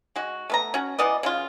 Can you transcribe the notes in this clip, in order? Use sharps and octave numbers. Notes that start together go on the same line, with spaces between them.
G#3 F#4
A3 B3 A#5
C#4 F#4
E3 B3 D5 D#5
C#3 F#3 F4